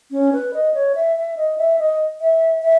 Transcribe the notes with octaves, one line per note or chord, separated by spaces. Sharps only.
C#4
B4
D#5
C#5
E5
E5
D#5
E5
D#5
E5
E5